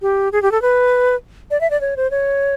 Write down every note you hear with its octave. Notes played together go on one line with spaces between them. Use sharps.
G4
G#4
G4
A4
B4
D5
E5
D5
C#5
C5
C#5